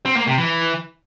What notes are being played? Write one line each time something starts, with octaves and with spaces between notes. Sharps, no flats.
C4
A#3
C3
E3